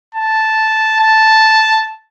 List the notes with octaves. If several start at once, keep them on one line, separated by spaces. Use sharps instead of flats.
A5
A5